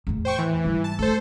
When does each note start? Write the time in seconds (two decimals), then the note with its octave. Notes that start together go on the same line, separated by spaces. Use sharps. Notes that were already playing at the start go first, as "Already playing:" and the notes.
0.07 E2 A2
0.25 C5 G5 C#6
0.39 E3
0.65 G#2 G3
0.84 A5
0.99 A3 A4 C5